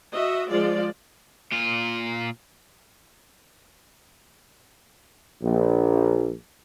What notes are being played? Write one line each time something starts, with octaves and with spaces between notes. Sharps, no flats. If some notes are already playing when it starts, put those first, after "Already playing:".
F#4 D#5 E5
F3 G#3 F4 D5
A#2 F4
A#1